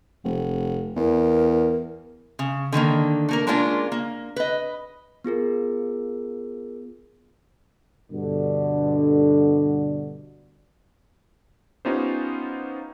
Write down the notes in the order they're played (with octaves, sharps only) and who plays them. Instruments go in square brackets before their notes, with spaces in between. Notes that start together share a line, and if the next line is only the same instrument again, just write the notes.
[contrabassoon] F1
[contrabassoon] E2 [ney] A#4
[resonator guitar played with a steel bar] C#3
D3 D#3 A3 A#3
A3 A#3 A#4
G#3 A#3 C#4 D4 F4 A#4
A#3
B4 D#5
[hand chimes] B3 F4 G#4 A#4
[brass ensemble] G2 B2 D3
[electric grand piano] B3 C#4 D#4 F4 G4 C5